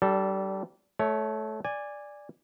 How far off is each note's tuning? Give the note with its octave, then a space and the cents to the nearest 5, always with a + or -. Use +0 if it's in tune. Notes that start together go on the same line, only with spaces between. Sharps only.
G3 -25 D4 +0 A4 +0
A3 -20 C#5 +10
D5 +0 G#5 -15